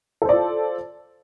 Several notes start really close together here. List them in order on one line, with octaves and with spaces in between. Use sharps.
A4 C5 D5 F4